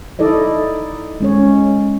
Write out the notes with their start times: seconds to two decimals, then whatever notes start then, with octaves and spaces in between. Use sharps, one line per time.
0.19 D#4 E4 A4 D5 D#5
1.20 G#3 C#4 C#5